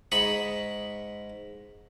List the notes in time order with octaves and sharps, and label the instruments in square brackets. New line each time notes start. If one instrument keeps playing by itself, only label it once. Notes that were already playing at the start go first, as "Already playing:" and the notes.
[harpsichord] G#2 B5 C#6 D#6